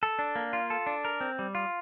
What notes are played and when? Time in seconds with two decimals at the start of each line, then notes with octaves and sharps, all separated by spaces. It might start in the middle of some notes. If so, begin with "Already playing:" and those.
0.03 A4
0.19 D4
0.36 A#3
0.53 F4
0.70 A4
0.87 D4
1.05 A#4
1.21 C4
1.39 G3
1.55 F4